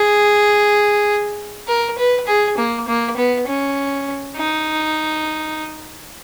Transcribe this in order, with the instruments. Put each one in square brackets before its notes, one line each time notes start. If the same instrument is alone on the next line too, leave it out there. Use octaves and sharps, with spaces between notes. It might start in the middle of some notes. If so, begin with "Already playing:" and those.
Already playing: [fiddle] G#4
A#4
B4
G#4
A#3
A#3
B3
C#4
D#4